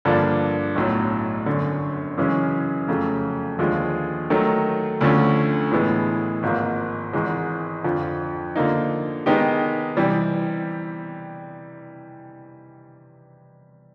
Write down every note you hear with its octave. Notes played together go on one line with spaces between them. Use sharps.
G2 D3 F3 A#3 D4
B1 A2 F#3
G1 F#2 D3
F#2 C#3 E3 G#3 C#4
F2 C#3 F#3 A3
D#2 D3 F3 G#3
D#3 F#3 A3
D2 D3 F3 A3 C#4
A2 E3 G#3 B3
G#1 G#2 F3 A#3
G#1 G#2 E3 G#3
F2 D3 F3
D3 F3 A#3 D#4
D#3 G#3 B3 D#4 G4
C3 E3 G3